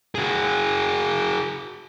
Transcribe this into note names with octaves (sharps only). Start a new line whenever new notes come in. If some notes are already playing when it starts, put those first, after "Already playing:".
F#4 G#4